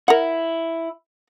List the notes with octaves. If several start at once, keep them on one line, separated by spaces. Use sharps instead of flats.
E4 A#4 F#5